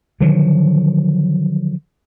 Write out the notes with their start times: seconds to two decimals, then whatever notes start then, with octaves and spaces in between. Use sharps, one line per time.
0.20 D3 D#3 F3 F#3